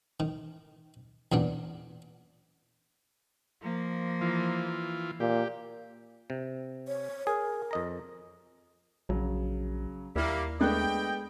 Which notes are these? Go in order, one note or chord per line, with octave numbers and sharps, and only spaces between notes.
D#3
E2 A#2 B3 D4
F3 A#3
E3 F4
A#2 G4
C3
C#5
G#4 A#4
F2 D#5 A#5
A#1 C#3 F#3
D#2 G3 A#3 E4 A#4 E5
G#3 A3 B3 D4 D#5 G5 F#6